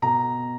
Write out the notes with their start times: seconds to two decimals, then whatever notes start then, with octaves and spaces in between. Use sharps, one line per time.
0.02 B2 A#5